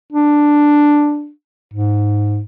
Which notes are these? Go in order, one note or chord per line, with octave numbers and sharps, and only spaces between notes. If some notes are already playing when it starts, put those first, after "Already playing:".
D4
G#2